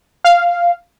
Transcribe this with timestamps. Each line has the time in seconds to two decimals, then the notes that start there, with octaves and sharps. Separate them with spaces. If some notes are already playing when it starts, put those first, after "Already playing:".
0.24 F5